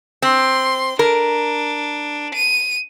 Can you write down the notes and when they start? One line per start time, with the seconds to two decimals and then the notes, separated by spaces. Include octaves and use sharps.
0.22 C4 C6
0.99 D4 A#4
2.34 D#7